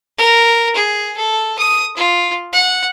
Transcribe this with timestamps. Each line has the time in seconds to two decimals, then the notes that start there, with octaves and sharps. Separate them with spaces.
0.18 A#4
0.75 G#4
1.17 A4
1.58 D#6
1.96 F4
2.53 F#5